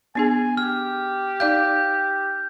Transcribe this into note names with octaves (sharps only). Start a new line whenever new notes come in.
B3 D4 G#4 G#5
G4 F6
D#4 D5 F5 G6